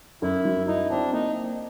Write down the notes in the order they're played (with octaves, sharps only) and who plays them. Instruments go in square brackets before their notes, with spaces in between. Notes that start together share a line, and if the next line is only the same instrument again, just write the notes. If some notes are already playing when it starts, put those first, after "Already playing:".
[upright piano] F#2 [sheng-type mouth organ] E4
[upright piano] F#3
[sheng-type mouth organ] D#4 [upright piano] E4
[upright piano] C4 [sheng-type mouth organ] D4
[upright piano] A#3 [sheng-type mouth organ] D#4